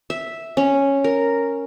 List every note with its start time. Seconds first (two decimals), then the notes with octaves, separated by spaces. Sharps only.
0.10 E5
0.57 C#4
1.04 A#4